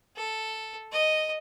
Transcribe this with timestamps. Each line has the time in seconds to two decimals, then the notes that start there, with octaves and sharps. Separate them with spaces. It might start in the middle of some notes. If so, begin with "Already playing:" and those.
0.16 A4
0.92 D#5